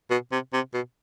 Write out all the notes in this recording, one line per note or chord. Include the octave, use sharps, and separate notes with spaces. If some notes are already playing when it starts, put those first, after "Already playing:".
B2
C3
C3
B2